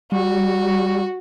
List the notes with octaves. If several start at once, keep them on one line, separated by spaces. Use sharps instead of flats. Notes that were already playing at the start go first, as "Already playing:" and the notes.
G3 F#4